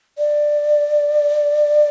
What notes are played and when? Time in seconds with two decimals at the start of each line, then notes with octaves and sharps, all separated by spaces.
0.18 D5